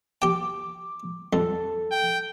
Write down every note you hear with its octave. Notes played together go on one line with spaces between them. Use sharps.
G4 G5 D6
F2 A4
G5